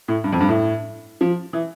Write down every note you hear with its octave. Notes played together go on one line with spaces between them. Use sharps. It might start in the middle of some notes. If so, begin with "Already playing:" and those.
A2
G2
F2
G2
A2
F3
E3